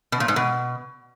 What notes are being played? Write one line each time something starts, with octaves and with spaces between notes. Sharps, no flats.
B2
A#2
G#2
B2